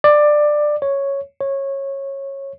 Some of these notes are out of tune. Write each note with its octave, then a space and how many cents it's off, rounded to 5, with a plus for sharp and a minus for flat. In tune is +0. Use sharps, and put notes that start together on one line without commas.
D5 +15
C#5 +0
C#5 -15